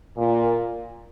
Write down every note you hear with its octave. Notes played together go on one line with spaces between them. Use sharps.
A#2